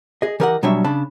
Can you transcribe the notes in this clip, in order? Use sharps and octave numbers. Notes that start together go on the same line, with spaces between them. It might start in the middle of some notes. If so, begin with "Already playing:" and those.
G#4 D#5
E3 G4 A#4 D#5 F5 F#5
B2 F#3 G3 D4 C#5 E5
C#3 D4 A5 B5